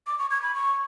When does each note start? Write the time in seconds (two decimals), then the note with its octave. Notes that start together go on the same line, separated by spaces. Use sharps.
0.07 D6
0.19 C#6
0.31 G#6
0.43 B5
0.54 C#6